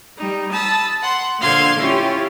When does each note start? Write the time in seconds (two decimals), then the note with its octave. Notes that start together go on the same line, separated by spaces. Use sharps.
0.16 G3 D#4
0.50 A5 B5 D#6 E6
1.01 F#5 C6
1.39 A#2 D3 C5 F5 C6 G#6
1.77 C#4 E4 F4 G4